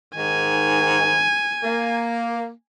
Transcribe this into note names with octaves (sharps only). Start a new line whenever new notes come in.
G#2 D#3 G#5
A#3